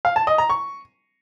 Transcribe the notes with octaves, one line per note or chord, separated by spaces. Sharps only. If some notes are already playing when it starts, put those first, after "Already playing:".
F5
A5
D#5
A#5
C#6